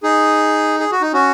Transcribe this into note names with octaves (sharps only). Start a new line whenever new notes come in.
D#4 G#4
G#4
F#4
D#4
C#4 F#4